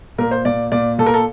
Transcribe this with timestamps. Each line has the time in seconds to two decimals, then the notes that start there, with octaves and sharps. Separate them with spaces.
0.18 A#2 A#4
0.31 C5
0.45 A#2 D5
0.72 A#2 D5
0.99 A#2 A4
1.06 A#4
1.14 A4